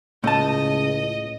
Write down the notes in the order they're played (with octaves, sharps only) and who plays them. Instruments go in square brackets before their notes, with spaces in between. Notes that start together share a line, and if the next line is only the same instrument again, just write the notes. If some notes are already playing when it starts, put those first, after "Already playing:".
[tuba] C#2 [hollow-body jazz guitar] A2 A5 [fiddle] D#5